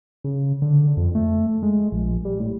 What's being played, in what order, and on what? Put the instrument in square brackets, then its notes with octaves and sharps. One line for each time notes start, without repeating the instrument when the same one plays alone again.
[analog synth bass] C#3
D3
F2
A3
G#3
A#1
G3
A2